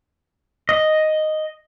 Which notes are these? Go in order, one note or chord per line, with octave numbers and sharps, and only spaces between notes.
D#5